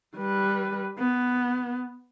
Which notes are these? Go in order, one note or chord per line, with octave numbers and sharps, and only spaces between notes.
G3 B4
B3